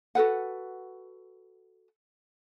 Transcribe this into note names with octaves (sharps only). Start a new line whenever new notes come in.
F#4 A4 B4 F#5